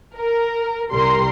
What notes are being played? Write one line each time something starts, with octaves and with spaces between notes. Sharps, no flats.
A#4
C2 G3 A#4 C6